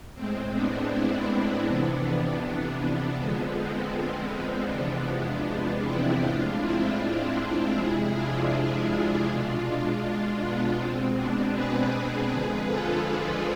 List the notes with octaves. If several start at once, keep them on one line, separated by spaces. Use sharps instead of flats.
A2 G#3 C4
B3 D4
C4 E4
F2 C3 E3 B3 D4
B3
B3
F2 D3 F3 G#3
C4
E2 C3 F3 G#3 B3 D4
C4 E4
A2 G#3 D4 F4
C4 E4
C4 E4
D4 F4
F2 C3 G#3 E4 G#4
D4 F4
B2 G#3 D4 F4
D4 F4
B3 D4
B2 G#3 C4
B3 D4
G#4 B4
F2 D3 F3 G#3 G#4 B4
F4 A4
D4 F4